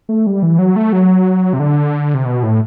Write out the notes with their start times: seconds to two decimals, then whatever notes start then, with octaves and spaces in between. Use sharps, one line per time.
0.09 A3
0.27 G3
0.43 E3
0.59 F#3
0.76 A3
0.93 F#3
1.53 C3
1.59 D3
2.14 C3
2.25 B2
2.43 A2